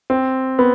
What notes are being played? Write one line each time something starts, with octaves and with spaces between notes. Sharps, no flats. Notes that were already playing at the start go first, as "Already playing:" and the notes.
C4
B3